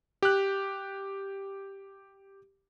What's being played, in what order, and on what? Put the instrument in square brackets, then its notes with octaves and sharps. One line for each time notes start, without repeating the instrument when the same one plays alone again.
[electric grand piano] G4 F#6